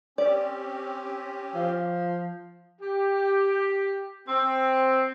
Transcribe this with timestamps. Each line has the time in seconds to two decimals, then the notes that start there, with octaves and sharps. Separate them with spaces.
0.18 C4 C#4 G4 D5
1.55 F3
2.80 G4
4.27 C4